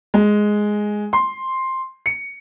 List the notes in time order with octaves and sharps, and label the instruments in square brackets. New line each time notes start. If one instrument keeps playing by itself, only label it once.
[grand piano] G#3
C6
C#7